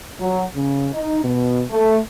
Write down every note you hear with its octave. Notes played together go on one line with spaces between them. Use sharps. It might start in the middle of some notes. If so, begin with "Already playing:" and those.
F#3
C#3
D#4
B2
A3